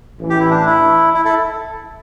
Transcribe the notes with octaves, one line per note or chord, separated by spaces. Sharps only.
A1 A2 E3
G4
E4
D4
E4
E4
E4 A4